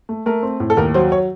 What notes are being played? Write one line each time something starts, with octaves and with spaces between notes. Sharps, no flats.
A3
A3 A#4
C4
A2
A4
D#2 A#4
F#3 C5
C#5